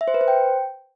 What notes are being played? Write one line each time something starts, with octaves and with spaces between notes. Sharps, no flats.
E5
C5
B4
C5
G5